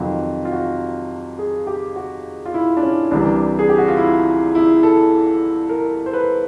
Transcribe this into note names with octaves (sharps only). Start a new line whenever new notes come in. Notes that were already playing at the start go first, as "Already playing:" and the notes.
Already playing: F2 C3 D#3 F#3 F4
F4
F#4
G#4
G4
F#4
F4
E4
D4
C#4
C2 C3 E3 G3 D4
G#4
G4
F#4
F4
E4
E4
A4
A#4
C5
B4